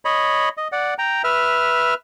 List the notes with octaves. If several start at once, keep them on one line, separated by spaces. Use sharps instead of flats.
C#5 D#5 B5
D#5
D5 F#5
G5 A#5
B4 E5 F6